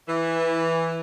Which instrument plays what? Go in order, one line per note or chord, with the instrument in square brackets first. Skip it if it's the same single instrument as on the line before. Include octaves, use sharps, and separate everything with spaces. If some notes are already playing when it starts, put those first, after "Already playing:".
[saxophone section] E3